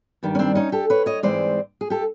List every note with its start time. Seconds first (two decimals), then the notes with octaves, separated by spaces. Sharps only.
0.23 G2 D#3 G3
0.35 C#4
0.39 C4 D4
0.55 C#4 D#4
0.72 G4 A4
0.90 B4 C#5
1.06 C#5 D#5
1.23 G#2 E3 G#3 C4 C5 D5
1.81 G#4
1.90 G4 A4